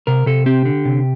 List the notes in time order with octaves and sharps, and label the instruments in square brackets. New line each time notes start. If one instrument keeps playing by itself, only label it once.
[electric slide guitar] C3 A#4
C3 A4
C4 G4
D3
C3